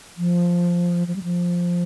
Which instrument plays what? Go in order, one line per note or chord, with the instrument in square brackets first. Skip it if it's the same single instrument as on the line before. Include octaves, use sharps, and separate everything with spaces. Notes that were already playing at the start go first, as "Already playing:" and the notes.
[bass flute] F3
F3
G3
F3